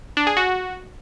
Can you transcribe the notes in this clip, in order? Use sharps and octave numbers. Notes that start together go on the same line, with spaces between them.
D4
G#4
F#4